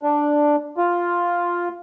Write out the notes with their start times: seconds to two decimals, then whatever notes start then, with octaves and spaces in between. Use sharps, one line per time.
0.03 D4
0.77 F4